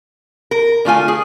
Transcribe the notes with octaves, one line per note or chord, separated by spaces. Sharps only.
A#4
D3 A3 F4 G#5
G#4